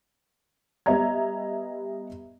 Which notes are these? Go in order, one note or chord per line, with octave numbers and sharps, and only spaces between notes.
G3 B3 D#5 E5 A#5 G#6